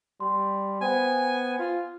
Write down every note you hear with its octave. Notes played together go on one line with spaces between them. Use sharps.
G3 C6
B3 C5 G5 G#5
F4